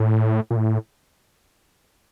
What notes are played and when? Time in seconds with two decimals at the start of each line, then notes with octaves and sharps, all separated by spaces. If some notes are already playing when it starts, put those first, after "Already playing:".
Already playing: A2
0.51 A#2
0.56 A2